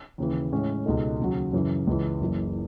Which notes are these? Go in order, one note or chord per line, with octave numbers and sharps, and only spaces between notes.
D#2 C#3 E3
A2 G#3 C#4
C#2 B2 G#3 D#4 A4
D#2 C#3 F#3
F#2 C#3 E3
C#2 C#3 E3
F#1 F#2 E3